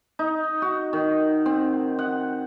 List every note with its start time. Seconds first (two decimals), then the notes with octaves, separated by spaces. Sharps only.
0.19 D#4
0.62 F#4
0.93 D#3
1.46 C4
1.99 F#5